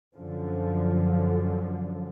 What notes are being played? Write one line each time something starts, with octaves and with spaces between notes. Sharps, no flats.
F#2 D3 F3